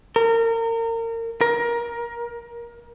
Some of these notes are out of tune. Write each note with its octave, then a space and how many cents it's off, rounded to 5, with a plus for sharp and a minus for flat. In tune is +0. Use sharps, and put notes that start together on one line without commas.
A#4 -30
A#4 +20